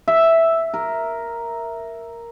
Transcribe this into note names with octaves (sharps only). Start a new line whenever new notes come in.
E5
A#4